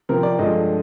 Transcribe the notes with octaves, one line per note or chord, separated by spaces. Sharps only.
C3 F3 C4 A#4
D5
G2 D3 F3 G#3 D4 D#5